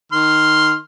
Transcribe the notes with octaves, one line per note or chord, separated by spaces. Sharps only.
D#3 C6 F6